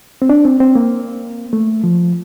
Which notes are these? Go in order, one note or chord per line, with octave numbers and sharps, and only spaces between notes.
C4
D4
C4
C4
A#3
A3
F3